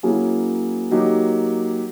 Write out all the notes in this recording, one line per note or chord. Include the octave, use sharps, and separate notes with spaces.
F#3 A#3 C#4 E4 G#4
F#3 A#3 D#4 G4